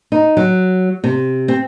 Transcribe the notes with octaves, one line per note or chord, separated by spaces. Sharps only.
D#4
F#3
C3
C4